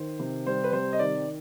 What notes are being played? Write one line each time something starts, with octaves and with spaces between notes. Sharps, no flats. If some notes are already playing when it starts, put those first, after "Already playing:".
Already playing: D#3 C5
C3
G3 C5
B4
C3 C5
D#5
D#3 D5